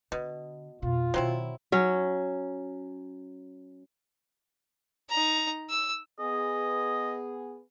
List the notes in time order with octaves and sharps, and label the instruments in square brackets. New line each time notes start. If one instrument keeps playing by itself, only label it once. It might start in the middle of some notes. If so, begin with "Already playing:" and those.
[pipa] B2 [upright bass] D3
[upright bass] F2 B2 [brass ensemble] F4
[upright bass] B2 D#3 [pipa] F#3 C4 E4
[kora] F#3 C#4
[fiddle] D#4 A#5
E6
[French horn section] B3 G#4 [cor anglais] D#5